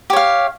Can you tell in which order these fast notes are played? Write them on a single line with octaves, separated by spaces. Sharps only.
G4 C#5 F5